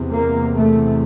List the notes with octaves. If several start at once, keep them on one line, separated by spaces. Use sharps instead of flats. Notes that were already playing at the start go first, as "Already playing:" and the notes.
Already playing: E2 C3
A#3
A3